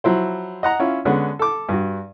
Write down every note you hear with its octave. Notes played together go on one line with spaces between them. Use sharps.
F3 F#3 E4 C5
D#5 F#5 A#5
C#4 E4 F4
D3 G#3 B3 C#4
A4 D6
G2 F#4